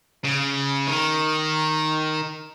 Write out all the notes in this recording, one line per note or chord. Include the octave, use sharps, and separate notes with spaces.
C#3
D#3